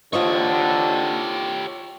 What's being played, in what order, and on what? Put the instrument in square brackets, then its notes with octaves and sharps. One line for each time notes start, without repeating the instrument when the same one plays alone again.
[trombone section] D#2 D3 [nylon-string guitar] F4 C5 D#5 [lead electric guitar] G4 C#5